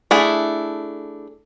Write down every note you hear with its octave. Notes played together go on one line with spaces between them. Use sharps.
A3 D4 E4 G#4